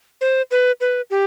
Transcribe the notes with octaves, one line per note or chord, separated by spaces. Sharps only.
C5
B4
B4
G4